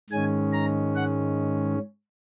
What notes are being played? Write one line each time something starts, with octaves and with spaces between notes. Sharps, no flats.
G#2 D#3 G#3 C#4 G#5
A#5
F#5